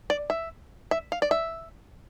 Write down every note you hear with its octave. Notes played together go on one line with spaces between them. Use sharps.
D5
E5
E5
F5
D5
E5